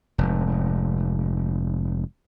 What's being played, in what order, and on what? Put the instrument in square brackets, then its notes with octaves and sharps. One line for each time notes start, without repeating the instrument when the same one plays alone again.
[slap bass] F1 G#2